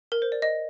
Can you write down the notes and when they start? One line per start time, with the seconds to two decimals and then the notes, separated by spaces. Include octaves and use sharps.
0.12 A#4
0.22 C5
0.32 D5
0.42 D#5